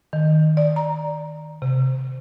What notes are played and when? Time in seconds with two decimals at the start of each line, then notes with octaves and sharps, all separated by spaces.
0.13 D#3
0.57 D5
0.76 A#5
1.62 C3